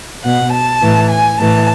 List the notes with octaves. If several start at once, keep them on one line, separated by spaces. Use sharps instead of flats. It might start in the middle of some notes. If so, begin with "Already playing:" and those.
B2 F#5
A5
A2 E3
G#5
A2 E3 A5